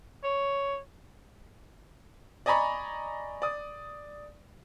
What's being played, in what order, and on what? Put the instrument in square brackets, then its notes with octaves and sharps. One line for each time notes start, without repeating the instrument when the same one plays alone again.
[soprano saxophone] C#5
[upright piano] D5 D#5 G#5 A#5 B5 C#6
D5 D#6